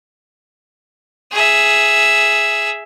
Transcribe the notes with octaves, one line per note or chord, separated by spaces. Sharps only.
G#4 E5